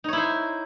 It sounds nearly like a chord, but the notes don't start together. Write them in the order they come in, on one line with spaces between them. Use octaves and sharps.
D#4 C#5 E4 C5